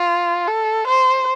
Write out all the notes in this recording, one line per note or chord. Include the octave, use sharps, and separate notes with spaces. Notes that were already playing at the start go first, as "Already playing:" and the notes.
Already playing: F4
A4
C5